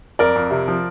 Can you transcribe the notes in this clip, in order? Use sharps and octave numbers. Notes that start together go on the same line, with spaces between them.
F2 A#4 D5
F2
C3
F3